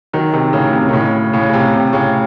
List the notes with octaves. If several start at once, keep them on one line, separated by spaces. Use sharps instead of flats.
D#3 F#3
C3 D#3
A2 C#3
C3
D#3
A2 C#3
A2 C#3
C#3
C3
C3
A2 C#3